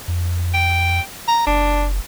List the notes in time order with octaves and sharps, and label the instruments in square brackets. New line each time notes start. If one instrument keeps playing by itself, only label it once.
[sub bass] F2
[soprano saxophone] G5
A#5
[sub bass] F#1 [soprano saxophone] D4